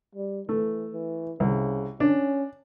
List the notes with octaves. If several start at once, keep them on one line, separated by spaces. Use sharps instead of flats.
G3
E3 A3
E3
C2 C#3
C#4 D4